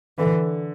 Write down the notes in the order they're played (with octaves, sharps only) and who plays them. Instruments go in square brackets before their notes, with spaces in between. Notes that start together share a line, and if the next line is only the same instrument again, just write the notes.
[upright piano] D3 [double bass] E3